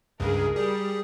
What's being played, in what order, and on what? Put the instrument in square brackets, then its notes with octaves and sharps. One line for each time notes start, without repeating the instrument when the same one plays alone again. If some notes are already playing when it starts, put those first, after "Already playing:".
[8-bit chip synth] C#2 G2 C#3 [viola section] G#4 A#4
[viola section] G3 [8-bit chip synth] G#4